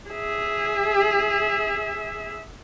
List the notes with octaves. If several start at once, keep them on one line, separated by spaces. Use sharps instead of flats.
G#4 E5